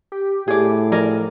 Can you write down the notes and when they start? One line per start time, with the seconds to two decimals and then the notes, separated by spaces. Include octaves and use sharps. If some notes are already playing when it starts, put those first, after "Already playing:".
0.12 G4
0.48 A2 G#4 D5
0.92 F3 G#4 A#4 D5